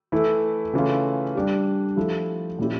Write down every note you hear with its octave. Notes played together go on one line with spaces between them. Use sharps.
E3 A3 E4
C#3 E3 A3 C#4 F4
G3 D4 G4
F3 A3 E4 G4
A#2 F3 C#4 E4 G4